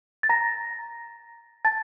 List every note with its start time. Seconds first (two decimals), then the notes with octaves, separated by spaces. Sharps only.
0.23 A6
0.29 A#5 A#6
1.65 A5 A6